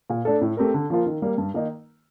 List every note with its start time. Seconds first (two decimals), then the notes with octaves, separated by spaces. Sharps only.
0.10 A#2
0.25 A3 D4 A4
0.41 A2
0.57 A3 C4 G4 A#4
0.74 D3
0.90 F3 A#3 F4
1.06 D#3
1.22 G3 A#3
1.38 G2
1.54 D#3 A#3 D#4